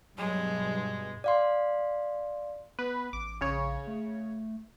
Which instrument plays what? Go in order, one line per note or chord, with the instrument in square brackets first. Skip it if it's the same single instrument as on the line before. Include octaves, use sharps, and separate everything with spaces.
[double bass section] G2 B2 [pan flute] F#3 [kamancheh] G#3
[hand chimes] D5 F5 C6
[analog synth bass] B3 [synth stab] B4
[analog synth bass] A1 [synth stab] D6
[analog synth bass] A#1 [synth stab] C#3 C#5
[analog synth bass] A3